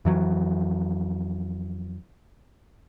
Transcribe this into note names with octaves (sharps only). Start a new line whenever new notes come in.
F2 E3 F#3